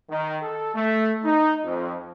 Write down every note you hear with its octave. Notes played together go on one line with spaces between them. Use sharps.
D#3
A4
A3
D#4
F2